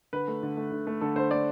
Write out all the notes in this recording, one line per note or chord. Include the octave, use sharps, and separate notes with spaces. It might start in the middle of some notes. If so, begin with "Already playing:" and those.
D3 B4
A3
D3
A3
D3
A3
D3 A4
D3 C5
A3 D5